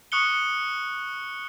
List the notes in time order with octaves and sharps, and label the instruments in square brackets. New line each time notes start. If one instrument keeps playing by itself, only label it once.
[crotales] C#6 D#6 F#6 C#7 G7